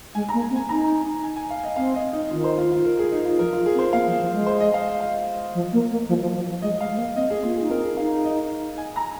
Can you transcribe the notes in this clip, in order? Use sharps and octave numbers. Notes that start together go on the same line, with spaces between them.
G#3 G#5
A#3 A#5
G#5
C4
G#5
D#4 A#5
G#5
G#5
F5
D#5
C4 F5
D#5
D#4
D#3 F4
C5
F4
F4
A#4
G#4
D#4
F4
F3 A#4
F4
G#4
C4
C5
A#3 F5
F3
F3
G#3
C5
D#5
F5
F5
F3
A#3
A#3
F3
F3
F3
F3
G#3 D#5
G#3 F5
G#3
A#3
C4 D#5
G#4
A#3 F4
D#4 G#4
C4 A#4
G#4
D#4 F5
D#5
G#5
A#5